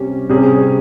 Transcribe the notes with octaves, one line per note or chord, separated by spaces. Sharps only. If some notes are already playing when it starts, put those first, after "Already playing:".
Already playing: C3 G3 C#4
C3 G3 C#4 G#4